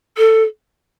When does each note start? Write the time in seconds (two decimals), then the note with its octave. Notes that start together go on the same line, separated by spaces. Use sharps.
0.17 A4